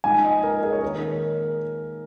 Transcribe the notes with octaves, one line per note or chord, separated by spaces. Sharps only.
A#2 F3 G#3 D#4 G#5
D#5
A#4
G#4
C#5
D#3 A#3 D#4 A#4